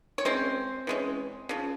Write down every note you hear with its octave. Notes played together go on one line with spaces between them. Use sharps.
C#5
E3 G#3 C4 C#4 C5
E3 G#3 C#4
C#3 F3